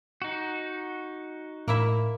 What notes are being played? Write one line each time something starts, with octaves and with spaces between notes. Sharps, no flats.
D#4 F#4
A2 A#3 E4 E5